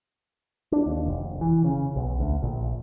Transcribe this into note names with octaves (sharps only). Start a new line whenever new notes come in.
D4
D#2
F1
E3
C#3
B1
D2
A#1